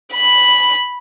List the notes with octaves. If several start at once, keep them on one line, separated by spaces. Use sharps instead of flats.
B5